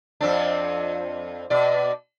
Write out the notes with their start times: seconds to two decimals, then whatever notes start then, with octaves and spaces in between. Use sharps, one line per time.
0.21 F2 C4 D4
1.50 B2 D5